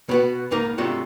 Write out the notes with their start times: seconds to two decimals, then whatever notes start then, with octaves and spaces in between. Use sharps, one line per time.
0.09 B2 B3 F#4
0.51 C#2 G#2 A#3 D#4 A#4
0.78 G#2 C3 F#3 A3 D4 F4